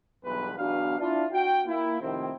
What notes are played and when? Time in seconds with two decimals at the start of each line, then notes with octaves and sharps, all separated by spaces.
0.24 B1 E2 G2 B4
0.57 B1 E2 B3 D4 F#4 F5
0.99 D4 E4 F4
1.32 F#4 G5
1.67 A#3 E4
2.01 A2 C3 D#3 F3 C4